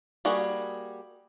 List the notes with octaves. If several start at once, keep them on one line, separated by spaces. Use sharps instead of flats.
G3 A#3 F#4 G#4